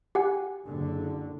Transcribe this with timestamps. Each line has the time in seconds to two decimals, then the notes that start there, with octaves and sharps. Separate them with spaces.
0.15 G4 F#5 G#5
0.65 F#1 D3